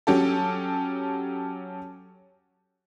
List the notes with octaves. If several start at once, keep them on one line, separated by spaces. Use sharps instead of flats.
F#3 C#4 G4 A4